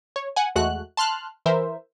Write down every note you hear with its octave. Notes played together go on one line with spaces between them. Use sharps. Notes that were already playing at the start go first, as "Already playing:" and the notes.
C#5
F#5 G#5
E2 G#3 A3 F#4 F#6
A5 C6 F6 F#6
E3 A#4 C5 E5